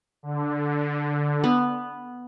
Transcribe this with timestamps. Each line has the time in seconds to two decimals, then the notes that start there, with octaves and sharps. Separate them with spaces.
0.23 D3
1.44 B3